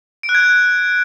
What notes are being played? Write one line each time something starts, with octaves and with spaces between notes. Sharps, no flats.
D7
F#6
G#6
F#6